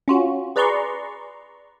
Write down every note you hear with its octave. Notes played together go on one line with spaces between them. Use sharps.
C#4 F4 F#4
G#4 B4 D5 A#5 C6 C#6